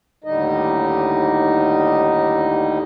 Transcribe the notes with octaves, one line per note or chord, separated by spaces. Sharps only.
D#2 A2 D3 G3 D#4 D#5